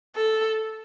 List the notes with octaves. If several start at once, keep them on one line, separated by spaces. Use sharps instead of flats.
A4